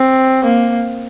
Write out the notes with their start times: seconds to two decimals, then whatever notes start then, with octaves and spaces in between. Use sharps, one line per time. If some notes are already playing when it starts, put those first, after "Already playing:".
Already playing: C4
0.45 A#3